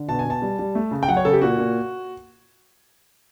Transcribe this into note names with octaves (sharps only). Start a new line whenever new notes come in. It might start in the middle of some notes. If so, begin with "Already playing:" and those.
Already playing: D3
B2 A5
G#5
B2
A5
G3
G3
A3
C#3
G5
F#3 F#5
C#5
C#3 A4
G4
A#2 F#4
A#2